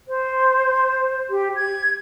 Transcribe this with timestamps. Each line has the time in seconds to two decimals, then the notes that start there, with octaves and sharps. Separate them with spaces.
0.08 C5
1.30 G4
1.56 G#6